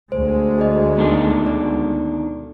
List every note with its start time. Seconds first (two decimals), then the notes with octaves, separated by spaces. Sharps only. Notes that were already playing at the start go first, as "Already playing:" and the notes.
0.12 D2 G#3 C5
0.58 G#4 D5 D#5
0.97 B2 D#3 D4
1.46 A4 D5